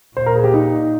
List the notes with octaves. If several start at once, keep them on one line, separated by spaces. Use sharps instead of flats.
A#2 C5
A#4
G#4
G4
D#4